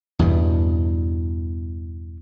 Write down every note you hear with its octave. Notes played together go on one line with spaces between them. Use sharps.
E2 G2 B2